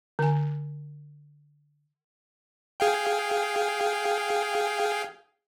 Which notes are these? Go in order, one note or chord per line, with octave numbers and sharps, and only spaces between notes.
D3 G#5
G#4 F5 G5